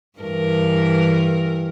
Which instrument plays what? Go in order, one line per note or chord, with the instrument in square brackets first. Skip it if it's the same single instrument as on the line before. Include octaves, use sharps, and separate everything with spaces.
[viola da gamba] G2 E3 A#4